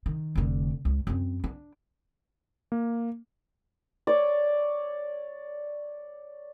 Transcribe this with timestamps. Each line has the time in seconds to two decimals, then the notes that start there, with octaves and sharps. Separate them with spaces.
0.06 D#3
0.36 F1 D3
0.85 C#2
1.07 F#2 C4
1.44 D4
2.72 A#3
4.07 C#5 D5